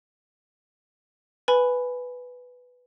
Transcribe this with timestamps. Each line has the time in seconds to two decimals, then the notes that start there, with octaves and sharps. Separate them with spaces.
1.48 B4 G#5 B5